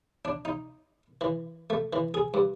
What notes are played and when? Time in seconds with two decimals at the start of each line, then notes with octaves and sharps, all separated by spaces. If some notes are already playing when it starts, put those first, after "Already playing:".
0.25 D4
0.45 D#4
1.21 E3
1.70 A3
1.93 E3
2.14 G#4
2.34 G2